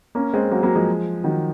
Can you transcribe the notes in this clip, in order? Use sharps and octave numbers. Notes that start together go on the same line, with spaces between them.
A#3 C#4
G#3 C4
F#3 A#3
F#3 A#3
F3 G#3
D#3 F#3